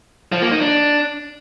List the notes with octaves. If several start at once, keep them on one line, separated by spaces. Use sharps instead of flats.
F3
A#3
D#4
D4